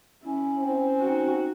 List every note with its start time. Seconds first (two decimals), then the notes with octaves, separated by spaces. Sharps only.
0.25 C#4 E4
0.58 C4
1.00 D#4 F#4